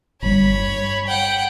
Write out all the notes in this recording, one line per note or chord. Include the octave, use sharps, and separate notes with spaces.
G1 G2 G3 C#5 B5
G2
F#5 G5